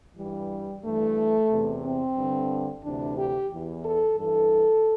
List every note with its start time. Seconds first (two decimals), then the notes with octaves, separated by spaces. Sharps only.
0.16 G2 E3 G3
0.83 G2 E3 A3
1.50 E2 C3 E3
1.83 C4
2.17 G2 D3
2.83 D2 C3 E3 D4
3.17 G4
3.50 E2 E3
3.83 A4
4.16 G2 E3 A4